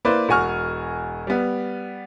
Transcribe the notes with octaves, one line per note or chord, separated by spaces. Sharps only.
A#3 E4 B4 C5 D5
E1 F#4 G#5 C#6 F6
G3 B3